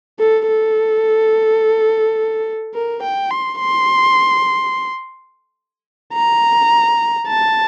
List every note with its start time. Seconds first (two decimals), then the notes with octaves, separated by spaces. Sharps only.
0.20 A4
0.48 A4
2.74 A#4
3.03 G5
3.31 C6
3.59 C6
6.14 A#5
7.28 A5